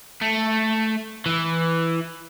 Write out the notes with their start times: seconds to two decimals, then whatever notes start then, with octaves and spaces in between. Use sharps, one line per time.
0.22 A3
1.26 E3